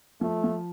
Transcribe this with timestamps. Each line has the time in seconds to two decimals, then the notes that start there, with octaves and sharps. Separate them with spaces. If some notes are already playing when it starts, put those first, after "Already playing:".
0.21 F3 A3
0.44 F3